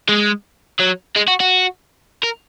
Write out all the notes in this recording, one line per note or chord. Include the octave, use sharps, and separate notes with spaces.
G#3
F#3
G#3
F#4
F#4
A#4